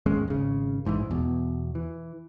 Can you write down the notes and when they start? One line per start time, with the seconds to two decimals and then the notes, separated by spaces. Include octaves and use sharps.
0.06 G#1 D#2 G#3 C#4
0.28 G#1 C#3
0.85 A#1 G#2 B2 E3
1.11 E2 B2
1.75 E3